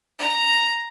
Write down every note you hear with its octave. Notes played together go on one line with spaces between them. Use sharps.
A#5